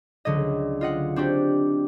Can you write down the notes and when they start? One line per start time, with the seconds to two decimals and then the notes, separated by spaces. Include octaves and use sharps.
0.25 C#2 D3 F#3 D#5
0.81 F4 D#5 F#5
1.16 C4 D4 F#4 G4